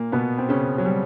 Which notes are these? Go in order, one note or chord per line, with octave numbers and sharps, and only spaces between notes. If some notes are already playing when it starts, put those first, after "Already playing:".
Already playing: A#2 A#3
B2 B3
C4
C#3 C#4
F#3
G3